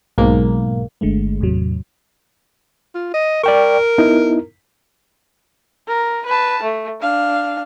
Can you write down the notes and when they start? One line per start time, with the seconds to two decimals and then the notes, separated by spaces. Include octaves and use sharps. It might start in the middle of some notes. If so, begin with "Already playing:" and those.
0.18 B1 G#2 A#3
1.01 G1 D3 G#3 A3
1.40 E2 A2 C3 F#3
2.95 F4
3.14 D#5
3.43 A#4 D5 G5 C#6
3.98 B3 D#4 E4
5.88 A#4
6.26 B4 A5
6.63 A3
7.01 D4 F5